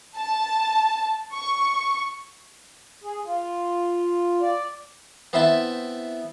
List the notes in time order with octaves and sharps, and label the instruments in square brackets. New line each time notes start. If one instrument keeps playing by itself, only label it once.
[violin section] A5
C#6
[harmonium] G#4
F4
D5
[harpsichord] B3 C4 E4 E5 G5 A5